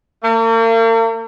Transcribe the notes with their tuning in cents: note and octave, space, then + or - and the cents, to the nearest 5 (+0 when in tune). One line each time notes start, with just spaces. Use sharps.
A#3 -45